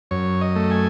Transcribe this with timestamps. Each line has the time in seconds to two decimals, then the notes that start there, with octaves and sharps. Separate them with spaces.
0.11 F#2 C#5
0.41 D#5
0.56 A3
0.71 G#5